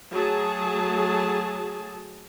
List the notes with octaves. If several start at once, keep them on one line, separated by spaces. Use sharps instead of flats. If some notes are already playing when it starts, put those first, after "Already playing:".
F#3 A3 F#4 G#4 A5